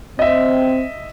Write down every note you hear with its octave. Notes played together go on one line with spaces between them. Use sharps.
C4 D#5 E5